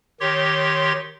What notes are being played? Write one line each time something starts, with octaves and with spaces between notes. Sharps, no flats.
D#3 G4 C#5 C6